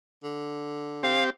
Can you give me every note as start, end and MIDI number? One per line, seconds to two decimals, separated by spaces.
0.24 1.22 50
1.03 1.30 60
1.03 1.30 67
1.03 1.24 77